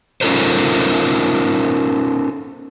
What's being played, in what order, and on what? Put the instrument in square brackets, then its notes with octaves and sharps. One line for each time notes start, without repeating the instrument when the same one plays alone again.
[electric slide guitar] C#4 D#4 F4 A4 A#4 C5